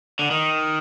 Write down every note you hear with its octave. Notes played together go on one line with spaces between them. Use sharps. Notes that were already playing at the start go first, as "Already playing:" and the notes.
D3
D#3